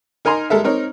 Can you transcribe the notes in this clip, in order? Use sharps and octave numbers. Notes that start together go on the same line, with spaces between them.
D#4 A#4 G#5 A#5 C6
G3 G#3 A4 A#4 E5
C4 D#4 A#4 C#5